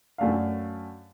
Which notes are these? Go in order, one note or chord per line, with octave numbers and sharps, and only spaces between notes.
F#2 A3 D4 F5